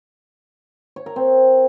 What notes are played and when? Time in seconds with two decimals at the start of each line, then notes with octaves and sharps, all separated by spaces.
0.96 C#5
1.06 A#4
1.16 C4